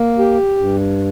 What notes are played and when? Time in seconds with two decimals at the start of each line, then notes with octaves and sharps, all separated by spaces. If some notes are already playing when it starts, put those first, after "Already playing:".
Already playing: A#3
0.18 G4
0.58 G2